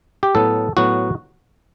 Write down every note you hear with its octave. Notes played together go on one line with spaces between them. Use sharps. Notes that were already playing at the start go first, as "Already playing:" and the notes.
G4
A2 F#3 B3 A4
A2 F#3 B3 F#4